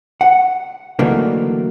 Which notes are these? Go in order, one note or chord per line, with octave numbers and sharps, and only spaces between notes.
F#5
D3 E3 F#3 A3 A#3 D#4